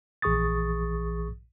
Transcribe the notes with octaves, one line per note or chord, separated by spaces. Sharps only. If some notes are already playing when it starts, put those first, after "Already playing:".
A#1 E3 G#4 C#6 D#6 A6